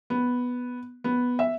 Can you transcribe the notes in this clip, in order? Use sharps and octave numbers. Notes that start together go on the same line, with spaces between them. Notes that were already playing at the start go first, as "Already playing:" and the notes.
B3
B3
E5